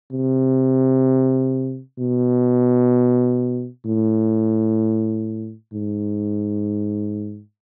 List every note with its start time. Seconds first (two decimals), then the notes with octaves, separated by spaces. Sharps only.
0.12 C3
1.99 B2
3.86 A2
5.73 G#2